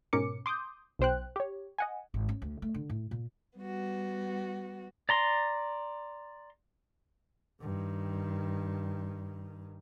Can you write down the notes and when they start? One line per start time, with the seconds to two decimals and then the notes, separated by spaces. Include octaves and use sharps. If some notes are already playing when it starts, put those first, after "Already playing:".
0.13 G#2 B2 C#4 A#4 D6 C#7
0.46 C6 D6 D#6 G6
0.99 B1 B2 C5 G5 F#6
1.36 G4 C#5
1.78 D#5 F#5 G#5
2.14 G#1
2.29 C#4
2.42 D2
2.62 A3
2.74 D3
2.90 A2
3.11 A#2
3.58 G3 B3 F#4
5.09 D5 A#5 C6
7.61 G2 D#3